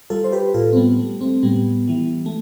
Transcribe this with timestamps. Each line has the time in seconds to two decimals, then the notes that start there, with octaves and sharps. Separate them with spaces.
0.10 G3 F4 A4
0.24 C5
0.32 G4 B4
0.54 A2 F4 A4
0.73 C4
0.76 G3 B3
0.98 G3 A3
1.21 A3 C4
1.43 A2 G3 B3
1.88 E3 G3
2.26 A3